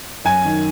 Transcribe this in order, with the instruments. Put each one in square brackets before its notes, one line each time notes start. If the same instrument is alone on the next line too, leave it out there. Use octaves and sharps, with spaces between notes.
[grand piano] F#2 [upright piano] G#5
[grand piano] D#3